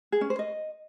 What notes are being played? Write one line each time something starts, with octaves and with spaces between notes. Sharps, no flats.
G#4
C#4
C5
D#5